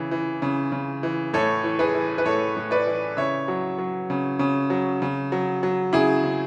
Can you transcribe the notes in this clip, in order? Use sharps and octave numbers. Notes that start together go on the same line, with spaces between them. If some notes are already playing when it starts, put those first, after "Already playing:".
Already playing: C#3 E3
E3
C#3
C#3
E3
A2 A4 C#5
E3
G#4 B4
E3
B4
A2 A4 C#5
A2
B4 D5
E3
C#3 C#5 E5
F#3
F#3
C#3
C#3
F#3
C#3
F#3
F#3
C#3 E4 G#4
C#3